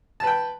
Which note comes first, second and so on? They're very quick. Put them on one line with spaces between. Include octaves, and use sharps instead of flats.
A5 B4 G5